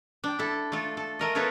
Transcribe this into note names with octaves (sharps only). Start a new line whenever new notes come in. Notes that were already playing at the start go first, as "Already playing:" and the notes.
D4 G5
E4 A4
A3 F4 A4
A4
A3 A#4 D#5
B3 E4 F4 A4 A#4 C#5